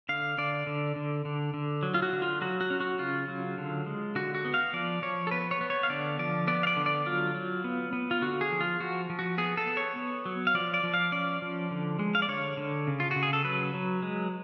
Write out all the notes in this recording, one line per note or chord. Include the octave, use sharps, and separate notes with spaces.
D3 F5
D3 D5
D3
D3
D3
D3
F#3
F4
F#4
D3
F4
F#3 F#4
F#4
C#4
F#4
C#3 F4
F#3
D3
G#3
D3 F#4
F#4
B3
F5
F3 D5
F3 C#5
A4
B3 B4
C#5
B3
C#5
F5
D3 D5
F3 D5
B3 D5
F5
D5
D3
D5
F#3 F4
F#3
B3
B3
F4
D3 F#4
G#4
F3
F4
F3 F#4
F3
F#4
B3 G#4
A4
B3
C#5
B3
F#3
F5
F3 D5
D5
F3
F5
C#4 D5
F3
D3
G#3
F5
D5
D3 C#5
D3
C#3
F4
C#3 F#4
G#4
A4
F#3 B4
F#3
G#3